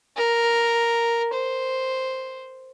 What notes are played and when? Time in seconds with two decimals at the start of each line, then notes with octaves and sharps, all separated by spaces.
0.17 A#4
1.34 C5